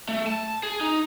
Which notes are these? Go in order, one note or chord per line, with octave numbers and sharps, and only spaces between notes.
A3
A5
G#4
D#4